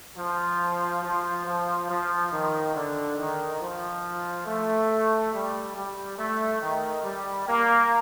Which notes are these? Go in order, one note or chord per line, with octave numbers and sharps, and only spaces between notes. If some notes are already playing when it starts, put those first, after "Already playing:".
F3
F3
F3
F3
D#3
D3
D#3
F3
A3
G3
G3
A3
D#3
G3
A#3